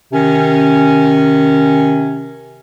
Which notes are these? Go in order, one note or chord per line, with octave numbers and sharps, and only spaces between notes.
C3 D#3 C#4